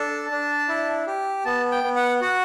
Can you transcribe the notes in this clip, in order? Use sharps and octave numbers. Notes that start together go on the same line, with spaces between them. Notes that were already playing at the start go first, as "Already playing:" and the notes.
Already playing: D4 A4 A5
D4
E4
G4
B3 A5
G5
B3
F#5
F#4 F#5